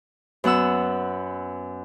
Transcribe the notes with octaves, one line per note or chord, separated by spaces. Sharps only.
F#2 B3 F#5 E6